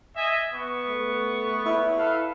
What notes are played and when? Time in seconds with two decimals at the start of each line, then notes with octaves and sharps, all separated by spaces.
0.16 D#5 E5 G#5
0.54 B3 C#6
0.88 A3
1.65 E4
1.97 A4 B4 F5